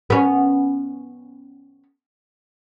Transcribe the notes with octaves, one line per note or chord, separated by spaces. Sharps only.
B3 C#4